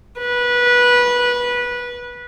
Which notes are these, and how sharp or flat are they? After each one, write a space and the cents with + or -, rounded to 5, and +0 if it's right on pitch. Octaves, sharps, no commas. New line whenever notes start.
B4 -20